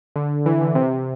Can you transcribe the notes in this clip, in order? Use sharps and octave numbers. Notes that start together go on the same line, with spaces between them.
D3
E3
D3
C3